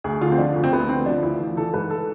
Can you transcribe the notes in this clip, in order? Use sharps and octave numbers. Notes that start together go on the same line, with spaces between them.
D2 G#4
D3 F4
C4
F3 D4
D2
C4
D2 B3
D3 C4
F3 D4
D2 E4
E3 F4
E3 A4
G#2 B4
A4